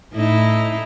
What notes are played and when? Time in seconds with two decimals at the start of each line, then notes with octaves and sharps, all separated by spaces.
0.14 A2 D#4 E4